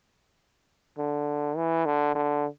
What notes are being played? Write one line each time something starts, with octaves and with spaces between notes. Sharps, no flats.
D3
E3
D3
D3